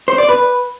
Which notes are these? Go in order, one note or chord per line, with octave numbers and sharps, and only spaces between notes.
C5
D5
B4